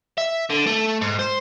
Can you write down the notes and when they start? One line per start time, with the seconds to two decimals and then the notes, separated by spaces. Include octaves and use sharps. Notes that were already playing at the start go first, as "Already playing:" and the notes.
0.18 E5
0.50 D3
0.67 A3
1.01 G#2
1.19 C5